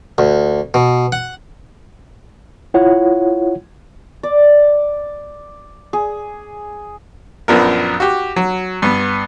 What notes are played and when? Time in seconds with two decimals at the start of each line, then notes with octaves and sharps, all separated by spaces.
0.18 D2
0.74 B2
1.12 F#5
2.74 E4 F4 C#5 F#5
4.23 D5
5.93 G#4
7.48 A#1 F#2 F3 B3 D4 A#4
8.00 F#4 G4
8.36 F#3
8.82 G2 B3